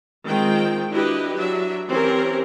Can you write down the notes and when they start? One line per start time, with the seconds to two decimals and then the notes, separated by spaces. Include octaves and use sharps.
0.25 D#3 G#3 C4 F4 G5
0.92 D4 E4 F#4 G4 B4 D#5
1.35 F#3 D4 E5
1.89 E3 C4 C#4 G4 A#4